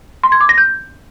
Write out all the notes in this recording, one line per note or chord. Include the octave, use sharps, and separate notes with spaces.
C6
G#6
D6
A#6
G6